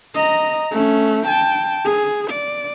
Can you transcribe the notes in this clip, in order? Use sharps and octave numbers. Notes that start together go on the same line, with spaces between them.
D#5 A#5
A3 C#4
G5 A5
G#4
D5